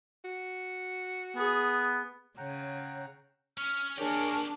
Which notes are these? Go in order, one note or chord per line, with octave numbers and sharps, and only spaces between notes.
F#4
B3 G#4
C#3 C#5 F#5 G5 A#5
C#4 C#5 F6
A#3 D4 G4 G#4 A#4 C#5